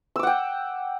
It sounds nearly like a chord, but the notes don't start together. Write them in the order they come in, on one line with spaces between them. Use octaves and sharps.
E6 D6 F#5 G5